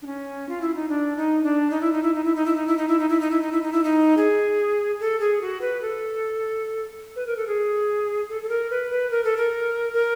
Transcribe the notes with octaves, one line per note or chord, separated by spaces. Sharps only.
D4
C#4
F4
E4
D#4
D4
D#4
D4
D#4
E4
D#4
E4
D#4
E4
D#4
E4
D#4
E4
D#4
E4
D#4
E4
D#4
E4
D#4
E4
D#4
E4
D#4
G#4
A4
G#4
F#4
B4
A4
B4
A#4
A4
G#4
A4
A4
A#4
B4
B4
A#4
A4
A#4
A#4